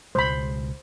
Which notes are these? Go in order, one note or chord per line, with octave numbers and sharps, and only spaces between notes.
C#2 B2 G#3 C5 B5